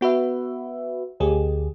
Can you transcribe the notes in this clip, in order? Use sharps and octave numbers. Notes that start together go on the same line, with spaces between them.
B3 F#4 B4 E5
D2 G4 G#4